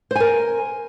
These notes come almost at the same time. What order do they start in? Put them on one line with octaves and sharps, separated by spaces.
C5 G#5 A#4